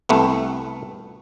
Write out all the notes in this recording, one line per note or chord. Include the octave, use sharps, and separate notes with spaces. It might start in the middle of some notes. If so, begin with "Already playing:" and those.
C2 A3 B3